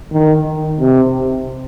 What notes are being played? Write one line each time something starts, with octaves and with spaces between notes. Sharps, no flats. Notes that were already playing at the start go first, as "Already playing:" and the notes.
D#3
C3